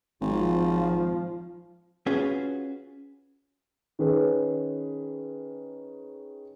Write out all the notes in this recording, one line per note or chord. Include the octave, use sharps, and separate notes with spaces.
G#1 F3
C#4 F4 F#4 G#4 B4
D#3 C#4 G#4 B4